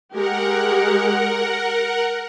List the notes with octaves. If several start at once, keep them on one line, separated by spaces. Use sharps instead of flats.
G#3 G4 A#4 F#5